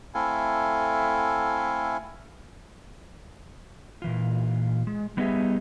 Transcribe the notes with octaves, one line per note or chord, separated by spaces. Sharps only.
A3 C4 E4 A4 F5 G#5
A#2 E3 F4
G#3
G3 B3 D#4 G4 G#4 E5